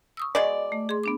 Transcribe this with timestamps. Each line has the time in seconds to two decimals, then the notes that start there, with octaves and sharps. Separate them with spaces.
0.17 C#6 D#6 E6
0.35 B2 G#3 D5
0.72 A3
0.89 G#4 C6
1.03 B3 D4 D6